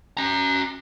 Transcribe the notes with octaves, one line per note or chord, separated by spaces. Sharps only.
C#4 A#5